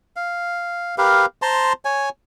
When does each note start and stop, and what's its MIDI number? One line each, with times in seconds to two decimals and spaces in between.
0.16 0.95 77
0.98 1.26 67
0.98 1.26 70
0.98 1.26 71
0.98 1.26 77
1.42 1.73 72
1.42 1.73 81
1.42 1.73 82
1.42 1.73 84
1.85 2.09 73
1.85 2.09 80